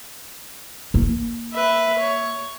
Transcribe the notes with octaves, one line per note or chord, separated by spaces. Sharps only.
A#3
B4 E5
C#5